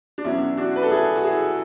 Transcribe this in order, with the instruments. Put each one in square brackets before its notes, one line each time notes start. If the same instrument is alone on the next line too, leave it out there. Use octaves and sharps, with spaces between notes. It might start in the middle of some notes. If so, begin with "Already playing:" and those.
[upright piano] D4
E2 B2 F#3 C#4 E4
D4 F#4
B4
A4
E4 G#4
F#4
E4 G#4